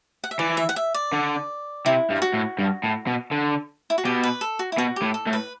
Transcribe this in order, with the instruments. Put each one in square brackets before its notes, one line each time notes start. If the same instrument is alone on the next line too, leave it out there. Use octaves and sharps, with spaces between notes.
[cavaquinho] F#5
E5
[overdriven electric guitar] E3 [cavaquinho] D5
[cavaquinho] E5
F#5
E5
D5
[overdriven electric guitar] D3
[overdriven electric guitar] C3 [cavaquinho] E4
[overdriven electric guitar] G2
[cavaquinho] F#4
[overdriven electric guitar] A2
G2
A2
B2
D3
[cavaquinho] E4
F#4
[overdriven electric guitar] B2 [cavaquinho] G4
[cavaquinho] B4
A4
F#4
E4
[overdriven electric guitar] B2 [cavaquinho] F#4
[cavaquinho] G4
[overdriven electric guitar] A2
[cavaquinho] A4
[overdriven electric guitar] A2
[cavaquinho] B4